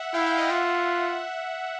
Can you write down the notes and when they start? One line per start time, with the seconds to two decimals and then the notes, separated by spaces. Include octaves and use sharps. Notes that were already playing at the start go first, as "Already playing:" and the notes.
Already playing: E5 F#5
0.14 E4 F5 G5
0.26 F5 G5
0.38 D#5 F5
0.50 F4 E5 F#5